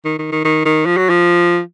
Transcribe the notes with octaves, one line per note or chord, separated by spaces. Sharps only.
D#3
D#3
D#3
D#3
D#3
F3
F#3
F3